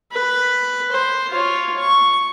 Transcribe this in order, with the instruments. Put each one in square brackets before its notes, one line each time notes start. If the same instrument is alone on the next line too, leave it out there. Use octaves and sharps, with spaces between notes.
[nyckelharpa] B4
C5
F4 C#5
C#6